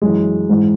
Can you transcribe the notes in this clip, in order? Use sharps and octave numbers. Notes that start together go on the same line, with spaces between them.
F#2 E3 G#3
G#2 E3